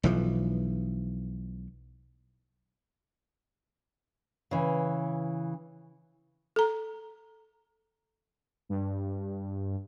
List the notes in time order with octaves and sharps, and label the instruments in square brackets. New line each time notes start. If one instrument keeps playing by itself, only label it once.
[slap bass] B1 E3 F3
[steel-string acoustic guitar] C#3 E3
[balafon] A4 A#5
[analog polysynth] G2